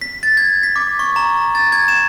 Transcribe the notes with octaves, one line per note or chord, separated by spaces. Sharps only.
B6
A6
G#6
B6
D6
C#6
A#5
A6
G#6
E7